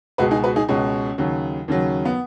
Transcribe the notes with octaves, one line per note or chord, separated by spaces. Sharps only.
C#2 B2 G#3 F#4 B4
D#4 G#4
F#4 B4
D#4 G#4
C#2 B2 G#3 C#4
D#2 C#3 F#3
D#2 C#3 F#3
B3